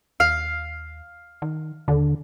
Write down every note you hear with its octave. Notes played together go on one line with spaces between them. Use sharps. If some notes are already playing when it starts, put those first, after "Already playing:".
D#2 F5
D#3
D#2 D3